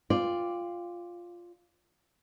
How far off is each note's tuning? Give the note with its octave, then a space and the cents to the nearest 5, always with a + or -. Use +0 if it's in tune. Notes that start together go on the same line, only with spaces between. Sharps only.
F4 +0 D5 +0 G5 +25